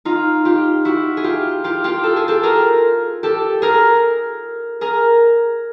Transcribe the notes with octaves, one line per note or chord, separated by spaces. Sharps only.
D#4 F4
F4 G4
E4 F#4
G#4
F4 G4
F4 G4
F4 G4
A4
G#4
G4 A4
G#4 A#4
G4 A4
G#4 A#4
G#4 A#4